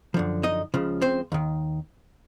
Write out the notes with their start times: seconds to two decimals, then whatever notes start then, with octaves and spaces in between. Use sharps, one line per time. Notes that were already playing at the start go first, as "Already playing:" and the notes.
0.14 F#2 D3 F3
0.43 D#4 D#5
0.74 C#2 C#3 F3
1.02 C4 C5
1.32 D#2 D#3